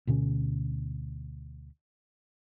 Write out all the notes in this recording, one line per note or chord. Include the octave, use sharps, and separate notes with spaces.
D2 B2 D3 C#4